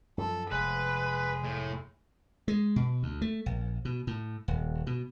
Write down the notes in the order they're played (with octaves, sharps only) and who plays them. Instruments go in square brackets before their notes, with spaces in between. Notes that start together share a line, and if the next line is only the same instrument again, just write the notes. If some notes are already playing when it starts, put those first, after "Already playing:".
[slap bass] F#2 F3 [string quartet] A4
[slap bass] F1 [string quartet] G#3 [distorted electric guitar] B4
[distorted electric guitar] A2
[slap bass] G#3
B2
D2
A3
A#1
B2
A2
D#1
B2